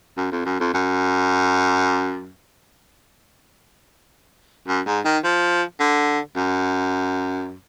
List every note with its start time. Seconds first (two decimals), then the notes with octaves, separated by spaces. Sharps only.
0.17 F#2
0.32 F2
0.46 F#2
0.60 F2
0.74 F#2
4.68 F#2
4.86 G#2
5.05 D#3
5.24 F3
5.80 D3
6.36 F#2